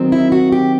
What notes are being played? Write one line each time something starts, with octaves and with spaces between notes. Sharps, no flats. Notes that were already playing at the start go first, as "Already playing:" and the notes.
Already playing: D#3 F#3 C4
E4
F#4
G4